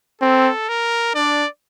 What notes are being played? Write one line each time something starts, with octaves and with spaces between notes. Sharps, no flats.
C4 A4
A#4
D4 D5